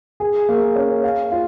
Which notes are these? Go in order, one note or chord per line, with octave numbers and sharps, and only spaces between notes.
G#4
A#3
C#4
F5
F4